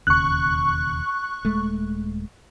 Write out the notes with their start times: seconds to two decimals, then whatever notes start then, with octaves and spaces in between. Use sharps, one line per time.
0.07 E1 D#2 C#3 C#6 F#6
1.45 D#1 G#3 A3